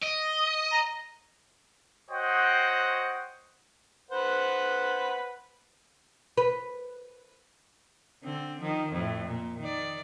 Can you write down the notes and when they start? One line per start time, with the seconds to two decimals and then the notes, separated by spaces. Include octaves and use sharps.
0.03 D#5
0.72 A#5
2.11 F#4 C5 C#5 D#5 F#5 G5
4.11 B4 C5 F#5
6.37 B4
8.24 D3 C4
8.60 D#3 F3
8.93 F2 A2
9.27 A#2
9.59 D#3 D5